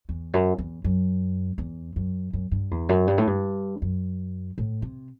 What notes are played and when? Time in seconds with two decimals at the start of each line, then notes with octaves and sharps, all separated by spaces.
0.09 E2
0.34 F#2
0.58 E2
0.84 F#2
1.58 E2
1.96 F#2
2.33 F#2
2.51 G2
2.71 E2
2.89 F#2
3.07 G2
3.18 A2
3.27 G2
3.82 F#2
4.58 A2
4.82 C3